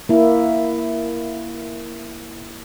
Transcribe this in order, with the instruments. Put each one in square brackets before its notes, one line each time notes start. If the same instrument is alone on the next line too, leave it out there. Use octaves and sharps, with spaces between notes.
[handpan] A#3 E4